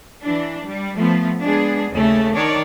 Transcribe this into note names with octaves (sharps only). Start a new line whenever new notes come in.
E3 D4
G3
F3 A3 B3
G#3 B3 D4 G#4
D#2 C#3 A3
D#3 D4 C#5 D5